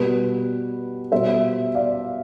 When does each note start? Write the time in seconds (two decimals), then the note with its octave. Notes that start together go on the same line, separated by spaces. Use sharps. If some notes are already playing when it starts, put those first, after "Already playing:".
Already playing: B2 G3 B4
1.12 B2 G3 C5 E5
1.75 D5 F5